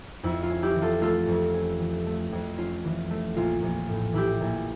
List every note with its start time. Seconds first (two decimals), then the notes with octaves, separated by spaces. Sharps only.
0.23 F2 E4
0.43 F4
0.50 C#4
0.62 E4 G4
0.76 E3
0.82 F4 A4
1.01 A3 F4 A4
1.28 F2
1.54 C#4
1.80 E3
2.06 A3
2.32 F2
2.58 C#4 F4
2.85 E3
3.11 A3
3.36 A#1 F4
3.62 A#1
3.89 A2
4.13 E3 E4 G4
4.41 A#1